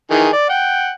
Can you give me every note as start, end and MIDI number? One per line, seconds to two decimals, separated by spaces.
0.11 0.28 51
0.11 0.28 52
0.11 0.28 68
0.33 0.49 74
0.49 0.91 78
0.49 0.91 79